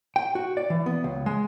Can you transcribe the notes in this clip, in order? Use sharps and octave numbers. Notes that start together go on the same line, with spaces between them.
G5
F#4
D5
E3
B3
C#2
G#3